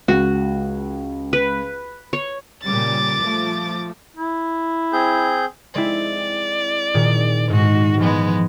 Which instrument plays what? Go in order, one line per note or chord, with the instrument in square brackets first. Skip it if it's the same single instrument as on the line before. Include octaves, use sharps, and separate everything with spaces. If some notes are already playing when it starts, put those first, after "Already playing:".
[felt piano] C#2 [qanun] F#4
[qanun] B4
C#5
[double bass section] A#2 C#3 G3 [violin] D6 A6
[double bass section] F3 A3
[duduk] E4
[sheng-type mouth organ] C4 G#4 G6
[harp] G#3 C4 E4 [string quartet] D5
[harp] A#2 D#3 G#4
[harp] G#2 [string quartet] G#3 F#4
[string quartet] E3 G#3 B3 [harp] F3